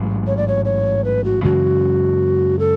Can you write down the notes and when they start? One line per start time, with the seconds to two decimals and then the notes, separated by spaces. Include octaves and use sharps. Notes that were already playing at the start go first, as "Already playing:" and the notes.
Already playing: A1 G#2 F#3
0.27 C#5
0.37 D5
0.48 C#5
0.65 C#5
1.04 B4
1.24 F#4
1.43 F#2 C#3 E3 G#3 F#4
2.59 A4